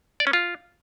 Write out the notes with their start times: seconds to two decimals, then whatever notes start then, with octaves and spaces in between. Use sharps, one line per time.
0.20 D5
0.27 C#4
0.33 F4